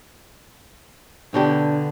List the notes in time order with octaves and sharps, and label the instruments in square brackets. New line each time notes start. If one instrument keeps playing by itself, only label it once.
[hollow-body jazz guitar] B2 D3 G4 [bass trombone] D4